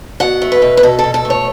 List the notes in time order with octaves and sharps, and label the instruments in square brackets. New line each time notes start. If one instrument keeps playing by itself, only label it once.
[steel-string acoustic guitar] B2 F#5
A3
B4
B2
B4
B2 A4
A4
B2
A4
A3
C#5